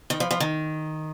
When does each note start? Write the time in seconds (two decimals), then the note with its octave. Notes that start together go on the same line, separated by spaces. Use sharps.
0.10 D#3
0.20 F3
0.31 F3
0.40 D#3